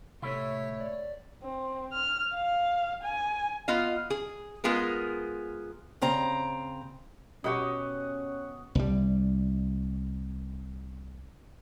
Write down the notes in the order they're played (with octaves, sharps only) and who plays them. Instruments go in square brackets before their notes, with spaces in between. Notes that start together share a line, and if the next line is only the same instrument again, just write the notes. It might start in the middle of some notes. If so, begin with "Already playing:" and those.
[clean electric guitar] A2 A3 E4 [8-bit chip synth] C3 [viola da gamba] C#5
[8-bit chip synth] D5
[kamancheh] C4
F6
F5
G#5
[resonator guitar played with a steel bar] B3 F4 D#5 F5
G#4
G#3 B3 F4 G#4 A#4
[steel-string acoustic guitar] C#3 C4 A#5
[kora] B2 G4 [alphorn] C#4 [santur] D#5 F#5 C#6
[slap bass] C2 G3